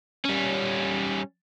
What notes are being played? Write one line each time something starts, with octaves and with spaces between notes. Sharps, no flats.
G3 C#4